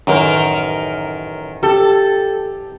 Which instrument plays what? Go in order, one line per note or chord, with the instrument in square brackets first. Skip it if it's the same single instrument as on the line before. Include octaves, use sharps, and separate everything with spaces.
[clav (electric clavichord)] A1 F#2 [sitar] D#3 A#4
[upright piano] G4 [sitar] A4